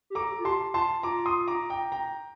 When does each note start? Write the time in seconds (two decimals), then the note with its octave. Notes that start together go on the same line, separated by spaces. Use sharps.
0.10 G4
0.15 A4 A#5 D6
0.39 F4
0.44 G4 A5 C6
0.74 F4 A5 C6
1.03 F4 A#5 D6
1.26 C6 D#6
1.48 A#5 D6
1.70 G5 A#5
1.92 G5 A#5